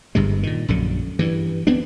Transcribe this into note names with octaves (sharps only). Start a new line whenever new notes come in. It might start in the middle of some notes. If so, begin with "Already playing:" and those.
G1 G2 C3 G#3
A#2 D#3
A#1 F#2 D3
G2 E3
D2 B3 C4 D4